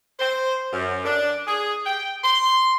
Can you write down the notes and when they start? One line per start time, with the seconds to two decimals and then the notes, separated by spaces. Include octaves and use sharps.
0.19 C5
0.73 F#2
1.05 D4
1.47 G#4
1.86 G5
2.23 C6